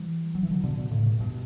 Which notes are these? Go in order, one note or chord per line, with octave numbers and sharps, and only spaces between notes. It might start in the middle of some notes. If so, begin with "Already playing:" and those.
Already playing: E3 G3
F#3
E3
D3 F#3
B2 D3
B2 D3
A2 C#3
G2 B2
G2 B2